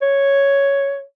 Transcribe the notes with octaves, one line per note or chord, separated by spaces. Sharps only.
C#5